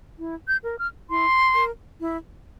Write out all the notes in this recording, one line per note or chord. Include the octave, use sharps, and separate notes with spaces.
E4
G6
A#4
F6
E4 C6
A#4
E4